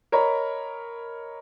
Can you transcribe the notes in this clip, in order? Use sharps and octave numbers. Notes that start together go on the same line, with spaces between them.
A#4 C#5 D#5 A#5 B5